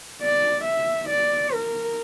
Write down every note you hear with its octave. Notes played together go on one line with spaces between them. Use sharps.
D5
E5
D5
A#4